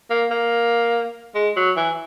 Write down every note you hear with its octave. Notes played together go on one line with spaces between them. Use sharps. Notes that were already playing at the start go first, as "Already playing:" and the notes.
A#3
A#3
G#3
F#3
E3